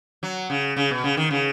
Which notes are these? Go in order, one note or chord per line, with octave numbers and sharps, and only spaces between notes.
F#3
C#3
C#3
B2
C#3
D#3
C#3